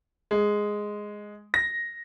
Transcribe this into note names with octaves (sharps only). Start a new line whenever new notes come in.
G#3
A#6